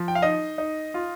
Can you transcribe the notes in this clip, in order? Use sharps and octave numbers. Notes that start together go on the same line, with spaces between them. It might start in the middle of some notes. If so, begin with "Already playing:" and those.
Already playing: F3
G5
F5
D#4 D#5
D#4
F4